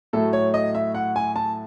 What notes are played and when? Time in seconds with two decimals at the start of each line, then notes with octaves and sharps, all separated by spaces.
0.13 A2 F#3 A3 A4
0.33 C#5
0.54 D#5
0.75 E5
0.95 F#5
1.16 G#5
1.36 A5